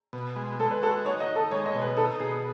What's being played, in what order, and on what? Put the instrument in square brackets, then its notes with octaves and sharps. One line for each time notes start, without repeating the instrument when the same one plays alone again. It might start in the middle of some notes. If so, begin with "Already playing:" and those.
[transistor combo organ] B2
G#3
[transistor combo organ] G#3 [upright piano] A4
[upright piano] B4
[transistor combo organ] F#4 [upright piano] A4
[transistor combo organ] D#4 [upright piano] C#5
[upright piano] D#5
[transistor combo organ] D#4
[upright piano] A4
[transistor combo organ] G#3 [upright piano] C#5
[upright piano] D#5
[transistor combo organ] B2
[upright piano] B4
[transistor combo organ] D#4 [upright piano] A4
[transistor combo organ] B2 [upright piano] G#4